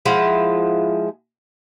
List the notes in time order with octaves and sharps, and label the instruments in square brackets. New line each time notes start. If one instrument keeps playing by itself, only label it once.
[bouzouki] F3 G#3 E4 F#5